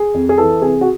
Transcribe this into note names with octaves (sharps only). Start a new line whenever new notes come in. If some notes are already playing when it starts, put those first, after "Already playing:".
Already playing: G#4
F2
G#4
E3 A4
C3 G#4
F#4